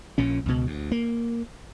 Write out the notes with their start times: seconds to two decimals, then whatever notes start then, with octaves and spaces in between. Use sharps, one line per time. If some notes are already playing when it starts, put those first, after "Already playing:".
0.18 A#1 A#2 C#4
0.46 C#2 B2
0.67 D2
0.92 A#3